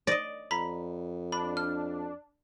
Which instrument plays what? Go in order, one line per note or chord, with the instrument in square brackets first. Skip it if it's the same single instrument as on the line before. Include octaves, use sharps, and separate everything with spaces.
[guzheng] D5 D#5 [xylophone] A#6
[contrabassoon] F2 [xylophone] A#5 B5 B6
[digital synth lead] D4 [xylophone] B5
[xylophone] F6